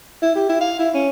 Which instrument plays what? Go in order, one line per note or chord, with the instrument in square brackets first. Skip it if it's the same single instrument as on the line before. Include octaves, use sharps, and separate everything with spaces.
[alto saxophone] E4
G4
E4
F5
E4
C#4